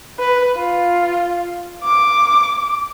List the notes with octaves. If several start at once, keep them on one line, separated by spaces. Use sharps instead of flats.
B4
F4
D6